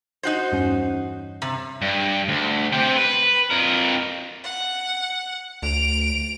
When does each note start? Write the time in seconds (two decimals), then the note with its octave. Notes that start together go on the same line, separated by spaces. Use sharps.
0.23 D#4 F#4 C5 G6
0.52 E2 G2 C#4
1.42 C3
1.82 G2
2.28 D2
2.73 C4 G4
2.96 B4
3.51 F2 A#4
4.44 F#5
5.62 D2 D7 F7